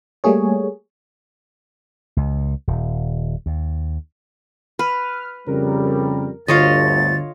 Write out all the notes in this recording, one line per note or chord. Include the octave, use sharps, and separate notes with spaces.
G3 A3 A#3 G#4 C#5
C#2
D#1
D#2
B4 F6
F2 C#3 G3 A#4
G1 D2 D3 F4 C#5 D#5 A6